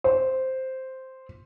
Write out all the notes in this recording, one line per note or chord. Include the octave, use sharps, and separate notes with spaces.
C5